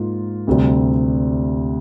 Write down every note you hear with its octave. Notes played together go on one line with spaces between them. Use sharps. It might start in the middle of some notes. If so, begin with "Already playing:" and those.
Already playing: G#2 A#3 F4
D2 C3 G3